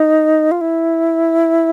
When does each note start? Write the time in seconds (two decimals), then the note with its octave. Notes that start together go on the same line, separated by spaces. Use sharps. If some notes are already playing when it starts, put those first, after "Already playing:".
Already playing: D#4
0.51 F4
0.61 E4